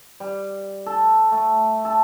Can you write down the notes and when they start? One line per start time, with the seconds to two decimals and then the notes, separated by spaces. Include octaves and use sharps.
0.20 G3
0.86 A4
1.32 A3
1.85 A4